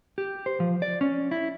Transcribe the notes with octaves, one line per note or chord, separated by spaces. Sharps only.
G4
C5
F3
D5
C#4
E4